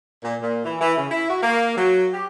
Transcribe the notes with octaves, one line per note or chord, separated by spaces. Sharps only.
A#2
A#2
E3
E3
C#3
E4
F#4
A#3
F#3
G4